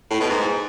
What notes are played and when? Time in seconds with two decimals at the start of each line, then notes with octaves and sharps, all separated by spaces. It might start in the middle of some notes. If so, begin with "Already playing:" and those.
0.10 A2
0.20 B2
0.30 G#2